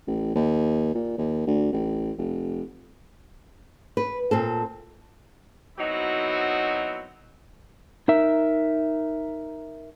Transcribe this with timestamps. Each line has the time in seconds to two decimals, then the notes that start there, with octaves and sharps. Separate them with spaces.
0.07 A1
0.35 D#2
0.94 A#2
1.18 D#2
1.47 D2
1.72 A1
2.18 F1
3.97 B4
4.31 A#2 C4 A4
5.78 F#3 B3 C4 D#4 E4 F#4
8.08 D#4 A#4 E5